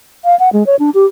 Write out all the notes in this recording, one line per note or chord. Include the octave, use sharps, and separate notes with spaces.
F5
F#5
G#3
C#5
D4
G4